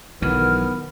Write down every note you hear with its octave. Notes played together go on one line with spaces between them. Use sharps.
B1 D#3 E3 F#3 B3 F6